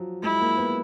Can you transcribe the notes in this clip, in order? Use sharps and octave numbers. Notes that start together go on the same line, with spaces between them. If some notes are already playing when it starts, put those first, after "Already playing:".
Already playing: F3 F#3
G#3 E4
A#3
B3